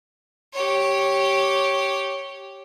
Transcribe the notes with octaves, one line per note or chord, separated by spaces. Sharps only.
G4 C#5